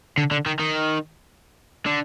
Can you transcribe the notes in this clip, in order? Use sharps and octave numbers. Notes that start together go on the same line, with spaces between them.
D3
D3
D#3
D#3
D3